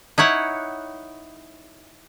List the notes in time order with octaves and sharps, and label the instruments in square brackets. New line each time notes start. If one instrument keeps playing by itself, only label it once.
[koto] D#4 E4 C#5 F#5